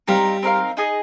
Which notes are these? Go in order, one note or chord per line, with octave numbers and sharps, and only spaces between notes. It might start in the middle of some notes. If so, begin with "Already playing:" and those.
G3 C4 D#4 A#4 F5
C4 D#4 A#4 F5
D#4 G#4 D#5